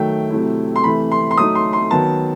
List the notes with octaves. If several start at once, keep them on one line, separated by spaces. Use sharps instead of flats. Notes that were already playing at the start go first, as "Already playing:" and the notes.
Already playing: D#3 F#3 A3 G5
C3 F#3 A3 E4
C6
C3 E3 A3 B5
C6
C6
F#3 A3 D#4 D#6
C6
C6
D#3 F#3 B3 A5